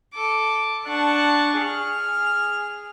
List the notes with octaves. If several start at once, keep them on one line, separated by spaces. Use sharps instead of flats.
A4 D6
D4 F#5 A5 C#6
G#4 F6